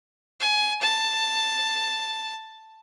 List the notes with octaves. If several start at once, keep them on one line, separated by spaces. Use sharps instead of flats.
G#5
A5